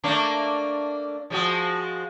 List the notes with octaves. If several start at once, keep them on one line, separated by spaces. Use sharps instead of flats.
A3 A#3 D4
F3 G#3 F#4